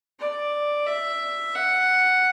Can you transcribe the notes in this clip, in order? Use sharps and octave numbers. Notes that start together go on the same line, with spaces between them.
D5
E5
F#5